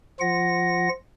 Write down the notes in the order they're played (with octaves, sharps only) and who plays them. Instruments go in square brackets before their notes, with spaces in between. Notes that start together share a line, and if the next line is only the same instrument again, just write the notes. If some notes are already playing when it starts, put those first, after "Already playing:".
[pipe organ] F3 F4 F#5 A#6